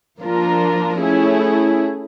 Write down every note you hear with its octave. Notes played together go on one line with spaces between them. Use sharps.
F3 A#3 D4 F4 A#4
A3 C#4 E4 G#4